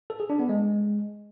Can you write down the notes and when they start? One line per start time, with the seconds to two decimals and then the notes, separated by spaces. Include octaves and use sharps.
0.10 A4
0.20 G#4
0.30 D4
0.39 B3
0.49 G#3